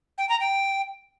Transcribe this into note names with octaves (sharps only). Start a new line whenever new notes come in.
G5
A#5
G5